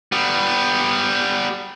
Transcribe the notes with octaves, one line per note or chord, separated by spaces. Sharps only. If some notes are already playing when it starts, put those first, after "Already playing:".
G3 B3